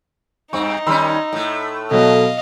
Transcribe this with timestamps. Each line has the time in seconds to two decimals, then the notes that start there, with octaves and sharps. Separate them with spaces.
0.53 G2 C4 D#4 C#6
0.87 D#3 G3 C#4 B5 C6 E6
1.33 A2 A3
1.91 B2 F#3 A4 D#5 F5